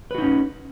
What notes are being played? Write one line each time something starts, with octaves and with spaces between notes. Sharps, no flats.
C#4 D#4 F#4 B4